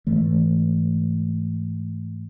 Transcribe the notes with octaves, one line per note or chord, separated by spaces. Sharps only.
G#2 E3 A3